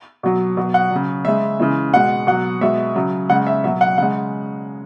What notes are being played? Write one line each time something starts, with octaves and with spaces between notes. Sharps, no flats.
B2 F#3
B2 F#3
F#5
C#3 F#3
C#3 G#3 E5
C#3 E3 G#3
B2 G#3 F#5
B2 F#3 F#5
B2 G#3 E5
C#3 F#3
C#3 G#3 F#5
E5
B2 F#3 E5
F#5
C#3 G#3 F#5